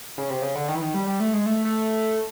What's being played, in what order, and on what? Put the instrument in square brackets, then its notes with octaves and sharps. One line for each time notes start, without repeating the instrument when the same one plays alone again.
[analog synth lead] C#3
C3
C#3
D3
D#3
E3
D#3
G3
G3
A3
G#3
A3
A3